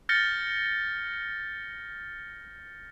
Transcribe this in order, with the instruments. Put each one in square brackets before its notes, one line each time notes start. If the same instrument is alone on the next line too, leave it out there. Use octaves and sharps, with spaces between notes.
[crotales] F6 G6 A6 A#6 C#7 G7